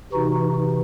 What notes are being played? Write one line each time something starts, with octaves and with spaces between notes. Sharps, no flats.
C3 E3 D#4 F#4